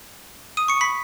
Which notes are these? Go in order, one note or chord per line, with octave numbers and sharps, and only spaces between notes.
D#6 D#7
C#6 C#7
B5 B6